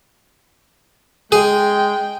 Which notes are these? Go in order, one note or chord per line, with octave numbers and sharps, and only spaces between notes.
G#3 G#4 G5